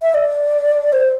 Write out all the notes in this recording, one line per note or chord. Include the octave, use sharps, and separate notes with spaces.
E5
D5
C5